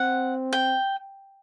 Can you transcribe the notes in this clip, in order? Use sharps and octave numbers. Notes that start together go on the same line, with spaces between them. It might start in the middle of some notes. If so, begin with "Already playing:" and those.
Already playing: C4 F#5
G5